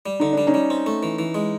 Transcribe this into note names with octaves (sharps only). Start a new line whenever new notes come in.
G3
D3 D#4
G3 D4
C#4 D#4
G3
C4
A3
E3
E3
G#3